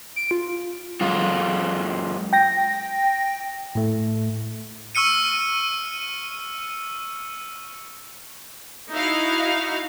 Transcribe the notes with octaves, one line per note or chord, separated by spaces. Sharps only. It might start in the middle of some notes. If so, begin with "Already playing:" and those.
D7
F4
F4
F#2 G#3 F4
G5 A#6
A2 A3
C#6 E6 F6 C#7 D#7
D#4 E4 F#4 E5 F5